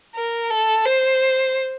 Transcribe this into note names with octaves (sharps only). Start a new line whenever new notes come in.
A#4
A4
C5